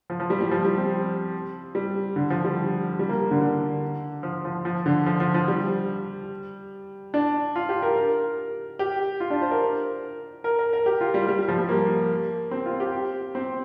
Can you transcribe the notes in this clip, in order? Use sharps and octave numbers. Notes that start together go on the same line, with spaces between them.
F3
F3
G3
G3
F3
G3
C4
G3
D3
F3
G3
G3
A#3
D3
D3
F3
F3
F3
D3
F3
F3
F3
G3
D4
F4
G4
A#4
A#4
G4
F4
D4
C5
A#4
A#4
A#4
A#4
G4
F4
G3
G3
G3
F3
G3
A#3
C4
F4
G4
C4